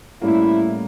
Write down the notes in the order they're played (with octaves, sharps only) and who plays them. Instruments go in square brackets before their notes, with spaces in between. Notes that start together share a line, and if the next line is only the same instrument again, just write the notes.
[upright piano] A2 G3 A#3 C#4 [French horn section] E4